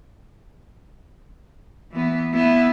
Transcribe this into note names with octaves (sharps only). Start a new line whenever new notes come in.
E3 B3
B3 E4